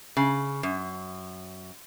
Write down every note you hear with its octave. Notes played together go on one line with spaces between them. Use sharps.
C#3
F#2